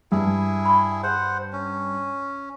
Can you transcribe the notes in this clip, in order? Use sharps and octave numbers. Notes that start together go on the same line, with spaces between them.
G2 E4 G#4
B5 C#6
C5 F#5
C#4